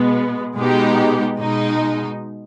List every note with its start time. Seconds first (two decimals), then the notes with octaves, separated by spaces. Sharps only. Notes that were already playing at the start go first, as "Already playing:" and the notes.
Already playing: B2 G#3 B3
0.57 B2 G#3 B3 D#4 G4
1.39 B2 G#3 D#4